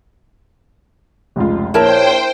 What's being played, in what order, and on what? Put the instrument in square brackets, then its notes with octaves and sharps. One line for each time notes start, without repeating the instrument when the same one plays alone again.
[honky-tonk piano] F1 C#2 F4
[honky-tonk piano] A#1 [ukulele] E4 A#4 A5 [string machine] C5 G5 [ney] C#5